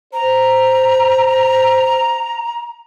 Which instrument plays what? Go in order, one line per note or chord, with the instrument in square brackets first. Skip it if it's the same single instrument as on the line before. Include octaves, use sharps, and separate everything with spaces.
[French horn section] C5 [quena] A#5